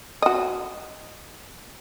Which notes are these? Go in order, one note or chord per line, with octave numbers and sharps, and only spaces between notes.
F#4 D#5